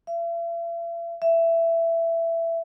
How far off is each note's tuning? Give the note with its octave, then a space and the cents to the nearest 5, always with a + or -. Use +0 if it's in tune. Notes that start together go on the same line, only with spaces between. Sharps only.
E5 +45
E5 +15